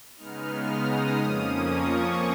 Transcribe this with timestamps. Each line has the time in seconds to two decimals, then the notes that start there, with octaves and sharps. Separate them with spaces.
0.16 C#3 G#3 B3 D#4 F6
0.67 D#6
1.17 F2 F3 A#3 C#4 D#6
1.69 C#6